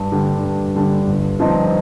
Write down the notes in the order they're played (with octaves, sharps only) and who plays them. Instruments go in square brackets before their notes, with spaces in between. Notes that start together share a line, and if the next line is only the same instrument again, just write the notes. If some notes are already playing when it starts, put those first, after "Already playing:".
Already playing: [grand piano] G2
D3 G3 D4
G2
D3 G3 D4
G1
G2 F3 C4 D#4